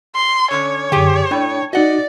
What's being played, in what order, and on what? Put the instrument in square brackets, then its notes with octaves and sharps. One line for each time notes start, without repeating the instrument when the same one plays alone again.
[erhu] C6
[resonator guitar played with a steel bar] D3 C#4 [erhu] C#5
[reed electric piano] F#2 D3 [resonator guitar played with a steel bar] G4 G#4 G5
[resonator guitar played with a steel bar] A2 [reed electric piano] D4 G5
[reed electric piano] D#4 F#4 [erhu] D5 [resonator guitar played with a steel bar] D#5 F#5